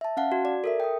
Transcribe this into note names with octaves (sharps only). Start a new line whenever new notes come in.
E5 A5
C#4 F5 F#5 A5
F#4
D5
A4 A#4 E5
G5 D#6